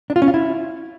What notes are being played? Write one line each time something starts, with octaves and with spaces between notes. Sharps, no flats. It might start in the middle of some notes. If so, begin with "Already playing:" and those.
D4
F4
C#4
F4
E4